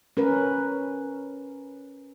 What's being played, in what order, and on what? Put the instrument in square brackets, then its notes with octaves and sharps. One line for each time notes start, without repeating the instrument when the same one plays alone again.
[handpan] C#4 A#4 B4